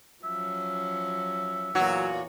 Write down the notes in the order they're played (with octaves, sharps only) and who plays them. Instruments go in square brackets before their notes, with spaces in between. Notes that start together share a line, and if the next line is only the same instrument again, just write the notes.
[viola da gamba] F3 F#3 C#4 [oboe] E5
[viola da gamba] E2 E3 C#5 [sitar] A#2 F#4 [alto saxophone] F#3